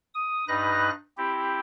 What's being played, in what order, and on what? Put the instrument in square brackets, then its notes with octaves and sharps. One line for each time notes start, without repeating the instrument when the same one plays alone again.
[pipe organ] D#6
G2 D#4 B4 F#6 A#6
C4 E4 G4